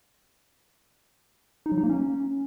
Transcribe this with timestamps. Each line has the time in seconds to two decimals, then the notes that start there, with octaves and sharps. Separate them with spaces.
1.66 D#4
1.72 F#3
1.78 D#4
1.83 A#3
1.89 C#4